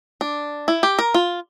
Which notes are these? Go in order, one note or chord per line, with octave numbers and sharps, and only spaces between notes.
D4
E4
G4
A#4
F4